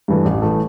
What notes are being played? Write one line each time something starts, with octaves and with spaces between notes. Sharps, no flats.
G2 E3 A3
A1
E3 A3